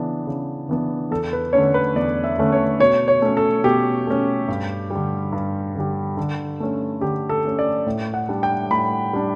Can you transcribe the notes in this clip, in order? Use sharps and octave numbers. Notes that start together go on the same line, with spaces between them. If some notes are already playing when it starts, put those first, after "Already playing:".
Already playing: C#3 E3 B3 D4
C#3
E3 B3 D4
E2 A4
B4
D3 A3 C#4 C#5
B4
E2 D5
E5
D3 A3 C#4
C#5
B2 C#5
C#5
A3 C#4
A4
B2 G4
A3 C#4
G2
D3 G3
G2
D3 G3
D3
A3 C#4
D3 G4
A4
A3 C#4
D5
A2
F#5
G3 D4
G5
A2 B5
G3 D4